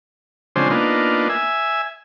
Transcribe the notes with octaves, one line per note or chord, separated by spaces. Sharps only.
C#3 F3 G#3 C4 D4 C5
A#3 B3 D4 D#4 F4
E5 G#5